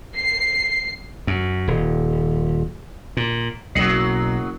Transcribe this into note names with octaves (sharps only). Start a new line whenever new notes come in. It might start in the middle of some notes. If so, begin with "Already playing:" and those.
C7
F#2
D#1
A#2
F#1 B1 F#3 D#5 C7 C#7 F#7